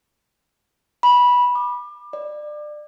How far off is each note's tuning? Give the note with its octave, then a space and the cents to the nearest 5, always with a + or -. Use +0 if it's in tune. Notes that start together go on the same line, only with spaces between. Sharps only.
B5 -15
D6 +30
D5 +25